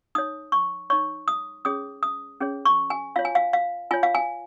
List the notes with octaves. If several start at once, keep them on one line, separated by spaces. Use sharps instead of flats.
D#4 C#5 D#6
C#6
D#4 C#5 C#6
D#6
C#4 G#4 C#5 D#6
D#6
C#4 G#4 C#5
C#6
G#5
F4 C#5 F5
G#5
F5
F5
F4 C#5 G#5
F5
G#5